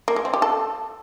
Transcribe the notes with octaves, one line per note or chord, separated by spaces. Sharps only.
A#3
G#3
C4
G4
A4